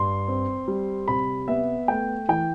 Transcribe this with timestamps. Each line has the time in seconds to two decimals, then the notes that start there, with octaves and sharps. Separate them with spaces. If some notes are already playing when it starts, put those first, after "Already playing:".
Already playing: G2 C6
0.28 C4
0.68 G3
1.08 C3 B5
1.48 B3 E5
1.88 A3 G5
2.29 E3 G5